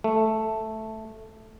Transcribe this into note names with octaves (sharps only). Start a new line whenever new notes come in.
A3